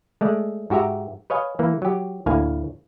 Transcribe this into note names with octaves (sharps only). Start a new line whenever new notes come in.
G#3 A3 D5
G#2 F#4 G4 E5 A#5
B4 C#5 D#5 F5 G#5
E3 A#3
F#3 G4
D2 A2 A#3 F5 G#5